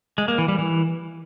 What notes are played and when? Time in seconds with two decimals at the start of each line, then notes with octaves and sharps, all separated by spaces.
0.18 G#3
0.28 A#3
0.38 E3
0.48 G3
0.58 E3